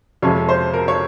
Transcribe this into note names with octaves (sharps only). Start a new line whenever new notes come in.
F2 C3 F3 G#3 C#4 C#5
C5
A#4
C#5